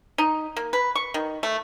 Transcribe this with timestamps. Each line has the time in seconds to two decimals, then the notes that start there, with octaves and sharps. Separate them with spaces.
0.18 D#4
0.56 A#3
0.73 B4
0.95 C#6
1.14 D#3
1.43 A3